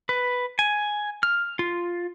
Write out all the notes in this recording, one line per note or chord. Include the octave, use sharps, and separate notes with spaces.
B4
G#5
F6
F4